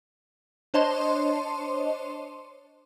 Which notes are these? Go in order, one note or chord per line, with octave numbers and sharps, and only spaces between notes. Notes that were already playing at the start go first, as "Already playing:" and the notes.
D4 C5 C#5 D#5 A5 C6